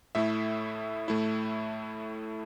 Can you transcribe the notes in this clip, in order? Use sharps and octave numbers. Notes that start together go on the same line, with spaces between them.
A2 A3 E4 E5
A2 A3 E4